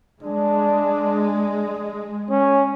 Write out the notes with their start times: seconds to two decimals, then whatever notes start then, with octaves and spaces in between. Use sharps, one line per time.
0.23 G#3 D4
2.31 C#4